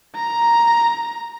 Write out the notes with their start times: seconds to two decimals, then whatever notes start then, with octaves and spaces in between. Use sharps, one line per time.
0.16 A#5